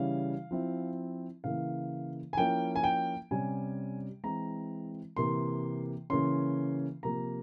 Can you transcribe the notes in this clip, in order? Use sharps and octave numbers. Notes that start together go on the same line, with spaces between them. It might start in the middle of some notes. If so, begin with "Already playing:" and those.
Already playing: C#3 E3 G3 C#4 E4 F5
F3 C4 E4
C#3 E3 A#3 E4 F5
G#5
F3 A#3 C#4 E4 G5
G#5
G5
C3 G3 C#4 G#5
E3 G#3 C4 E4 A#5
C3 E3 A#3 C6
C#3 E3 A#3 C#4 C6
C3 F3 A#3 A#5